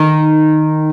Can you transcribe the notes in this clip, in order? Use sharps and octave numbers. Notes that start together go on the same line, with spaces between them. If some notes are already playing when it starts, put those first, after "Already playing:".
Already playing: D#3